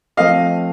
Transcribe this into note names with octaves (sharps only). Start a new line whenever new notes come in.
F3 A3 C4 D#5 F5